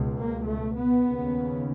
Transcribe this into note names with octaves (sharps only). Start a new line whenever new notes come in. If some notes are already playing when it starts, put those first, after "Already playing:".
Already playing: C#2 B2
A#3
A3
B3
D#2 C#3